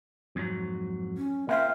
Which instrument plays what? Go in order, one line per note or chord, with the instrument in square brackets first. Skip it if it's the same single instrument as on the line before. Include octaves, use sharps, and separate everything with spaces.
[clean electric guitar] F2 G#2 F#3
[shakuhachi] C#4
[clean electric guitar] A#3 C4 F4 [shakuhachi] E5